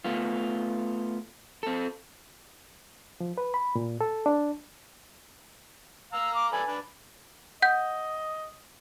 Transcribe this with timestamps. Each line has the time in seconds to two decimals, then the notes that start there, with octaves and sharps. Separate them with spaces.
0.04 A3 B3 F4
1.63 C4 A4
3.20 F3
3.38 B4
3.54 B5
3.75 A#2
4.01 A4
4.26 D4
6.13 F5 A#5 E6
6.34 D6
6.52 A4 B4 D5 G#5
6.68 D4 B4
7.62 D#5 F#5 G6